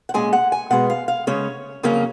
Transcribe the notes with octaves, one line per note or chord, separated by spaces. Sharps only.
F#5
A#2 G#3 C#4 G#5
F#5
G#5
B2 G#3 B3 F#5
F5
F5
C#3 G#3 C#4 C#5
F2 C#3 F#3 A#3 C#4